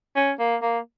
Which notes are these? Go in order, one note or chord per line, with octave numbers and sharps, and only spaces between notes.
C#4
A#3
A#3